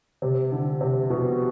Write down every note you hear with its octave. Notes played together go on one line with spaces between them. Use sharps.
C3
D3
C3
B2